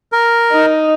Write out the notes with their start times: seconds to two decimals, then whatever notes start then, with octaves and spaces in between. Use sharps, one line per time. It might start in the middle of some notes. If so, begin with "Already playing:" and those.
0.12 A#4
0.51 D#4